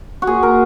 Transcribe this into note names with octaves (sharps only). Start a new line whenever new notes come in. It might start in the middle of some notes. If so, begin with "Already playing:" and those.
F#4
A#2 G#4
A#4